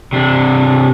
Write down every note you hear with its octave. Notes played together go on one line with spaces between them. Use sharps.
C3 D4